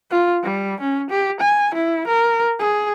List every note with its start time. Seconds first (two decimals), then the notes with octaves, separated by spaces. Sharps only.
0.10 F4
0.43 G3
0.81 C#4
1.10 G4
1.41 G#5
1.74 E4
2.08 A#4
2.59 G#4